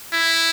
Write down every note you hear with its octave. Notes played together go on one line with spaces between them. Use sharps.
E4